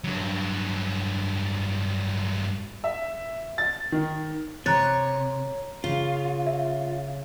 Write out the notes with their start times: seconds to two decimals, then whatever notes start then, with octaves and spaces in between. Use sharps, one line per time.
0.04 G2 F#3
2.84 E5
3.58 A6
3.92 D#3
4.66 C3 C#5 A#5 F#6 A6
5.84 C#3 F4
6.47 E5